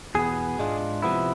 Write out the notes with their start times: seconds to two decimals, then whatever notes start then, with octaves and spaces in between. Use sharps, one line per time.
0.15 E2 B2 B3 G#4
0.59 G#2 G#3 D4 F4
1.02 C3 F3 B3 E4